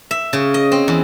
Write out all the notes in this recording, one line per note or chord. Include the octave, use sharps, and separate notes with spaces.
E5
C#3
D#5
C4
E2